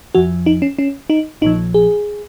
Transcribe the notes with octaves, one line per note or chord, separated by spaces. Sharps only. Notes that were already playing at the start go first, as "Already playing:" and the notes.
F2 F3 F#4
D#4
C#4
C#4
D#4
A#1 A#2 F3 D#4
G#4